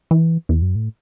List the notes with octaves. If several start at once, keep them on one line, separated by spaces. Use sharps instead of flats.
E3
E2
F#2
A2